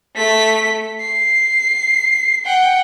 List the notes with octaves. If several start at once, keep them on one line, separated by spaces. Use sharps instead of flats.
A3 B6
C7
F#5 G5